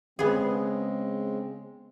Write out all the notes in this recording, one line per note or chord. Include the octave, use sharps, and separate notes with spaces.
C#3 G#3 B3 C4 G#4